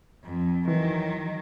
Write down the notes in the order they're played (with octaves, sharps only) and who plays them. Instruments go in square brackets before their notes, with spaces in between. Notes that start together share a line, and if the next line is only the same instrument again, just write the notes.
[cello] F2
[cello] D#3 F#3 [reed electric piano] E3